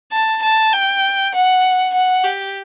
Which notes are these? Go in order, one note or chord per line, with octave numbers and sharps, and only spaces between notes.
A5
A5
G5
F#5
F#5
G4